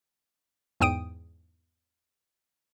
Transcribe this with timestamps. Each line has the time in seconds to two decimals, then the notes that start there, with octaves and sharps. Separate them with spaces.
0.80 E2 G#2 G5 D#6 D7 D#7